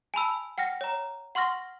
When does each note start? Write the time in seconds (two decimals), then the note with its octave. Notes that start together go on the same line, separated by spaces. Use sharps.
0.14 G#5 A5 B5 E6
0.58 F#5 G5 F6 A#6
0.81 C#5 A#5
1.35 F#5 C6 C#6 F6 A#6